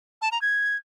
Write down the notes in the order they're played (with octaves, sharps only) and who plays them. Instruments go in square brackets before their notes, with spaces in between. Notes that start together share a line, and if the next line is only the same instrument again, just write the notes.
[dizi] A5
A#5
G#6